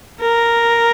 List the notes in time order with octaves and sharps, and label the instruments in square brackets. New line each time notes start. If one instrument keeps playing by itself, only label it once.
[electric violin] A#4